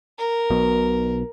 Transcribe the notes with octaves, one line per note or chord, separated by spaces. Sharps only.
A#4
B1 B2